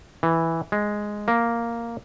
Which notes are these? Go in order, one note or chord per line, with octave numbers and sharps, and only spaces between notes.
E3
G#3
A#3